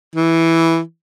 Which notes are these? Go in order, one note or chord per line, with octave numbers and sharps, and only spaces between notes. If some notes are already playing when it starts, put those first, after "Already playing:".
E3